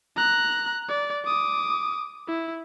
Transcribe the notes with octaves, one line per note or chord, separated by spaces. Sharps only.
A#5 F#6
D5
D6 D#6
E4